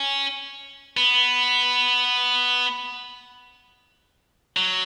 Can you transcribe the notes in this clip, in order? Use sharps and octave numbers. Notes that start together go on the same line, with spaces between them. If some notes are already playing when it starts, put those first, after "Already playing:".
Already playing: C#4
B3
F#3